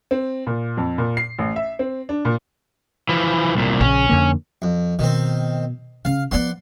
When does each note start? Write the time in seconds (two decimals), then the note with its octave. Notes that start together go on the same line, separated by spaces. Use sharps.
0.11 C4
0.47 A#2
0.77 F2
0.98 A#2
1.17 C7
1.38 A1
1.56 E5
1.79 C4
2.09 D4
2.25 A#2
3.09 E3 F3
3.55 C2 A#2
3.81 A#1 C#3 C#4
4.09 F2 D3 A#3
4.62 F2
4.99 B2 D#3 C4
6.05 C#3 C#4 F5
6.31 F3 B3 D5 F#5 C6